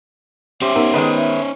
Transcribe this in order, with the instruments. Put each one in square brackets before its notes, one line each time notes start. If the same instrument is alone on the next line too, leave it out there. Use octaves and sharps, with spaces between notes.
[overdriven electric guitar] C#4 C5 [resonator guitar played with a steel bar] G4 [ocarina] E5
[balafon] B3 D#4 A#4
[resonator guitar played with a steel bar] D#3 G#3 B4
[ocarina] E5